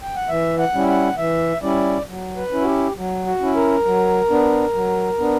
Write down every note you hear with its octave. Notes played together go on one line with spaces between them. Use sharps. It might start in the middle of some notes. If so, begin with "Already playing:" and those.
G5
F#5
E3 E5
F#5
G3 C#4 E4
F#5
E3 E5
G3 C#4 E4 D5
F#3
B4
C#4 E4
F#4
G4
F#3
F#4
C#4 E4
A#4
F#3
B3 D4
F#3
B3 D4